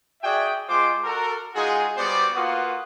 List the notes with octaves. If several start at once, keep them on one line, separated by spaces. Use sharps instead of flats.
F#4 G#4 D5 E5 G5
G#3 F4 C5 D6
F#4 A4 A#4
G#3 D#4 F4 F#4 G#4
G3 B3 F#4 C5 D5
A#3 F4 F#4 B4 F#5 D#6